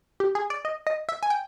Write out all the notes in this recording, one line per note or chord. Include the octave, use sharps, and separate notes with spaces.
G4
G#4
D5
D#5
D#5
E5
G#5
G5